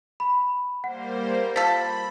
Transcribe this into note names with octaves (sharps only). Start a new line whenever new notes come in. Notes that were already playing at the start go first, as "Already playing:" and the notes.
B5
G3 A#3 C5 F#5
F3 A4 B5 B6